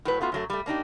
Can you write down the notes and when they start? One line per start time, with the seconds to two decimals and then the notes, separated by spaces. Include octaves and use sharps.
0.05 A2 F#3 B4
0.21 A3 B3 F4 F#4
0.32 F#2 F#3 A3
0.50 G3 A3
0.66 A#3 D4 D#4 G4